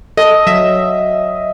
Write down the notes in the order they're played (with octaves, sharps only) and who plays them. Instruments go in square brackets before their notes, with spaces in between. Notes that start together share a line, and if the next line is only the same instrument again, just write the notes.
[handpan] A4 [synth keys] D#5
[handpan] F#3 [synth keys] E5